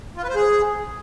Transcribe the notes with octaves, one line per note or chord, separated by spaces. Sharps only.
F4
B4
C5
G#4